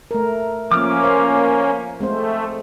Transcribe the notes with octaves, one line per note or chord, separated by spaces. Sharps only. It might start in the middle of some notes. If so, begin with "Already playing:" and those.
A3 A#4
F3 A#3 C#4 D6 F6
C5 F5
G#3 A3 C4 C5